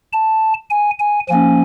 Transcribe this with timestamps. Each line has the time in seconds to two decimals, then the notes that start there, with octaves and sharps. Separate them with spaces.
0.13 A5
0.70 G#5
1.00 G#5
1.29 F3 A#3 C#4 G#5